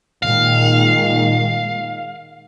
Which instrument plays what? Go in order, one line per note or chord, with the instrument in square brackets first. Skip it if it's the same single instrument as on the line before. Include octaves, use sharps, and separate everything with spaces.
[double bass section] A#2 D#3 G#3 [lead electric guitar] F5